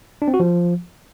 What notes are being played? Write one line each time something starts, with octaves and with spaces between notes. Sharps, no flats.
D4
C4
F#4
F3